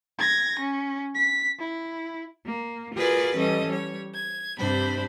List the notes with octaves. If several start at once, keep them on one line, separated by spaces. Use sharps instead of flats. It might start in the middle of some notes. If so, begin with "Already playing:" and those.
G#6 A#6
C#4
B6
E4
A#3
F4 F#4 G#4 A#4 B4 D5
E3 G3 C#4 A4 D#5
G3 C#5
G#6
G2 C3 D4 C5 B5